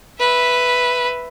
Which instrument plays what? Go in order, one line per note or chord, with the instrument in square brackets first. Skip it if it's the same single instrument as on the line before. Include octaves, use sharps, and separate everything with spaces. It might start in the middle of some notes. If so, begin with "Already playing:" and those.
[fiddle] B4 E5